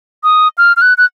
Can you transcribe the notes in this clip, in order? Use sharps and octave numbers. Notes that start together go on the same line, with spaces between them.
D#6
F6
F6
F#6
F#6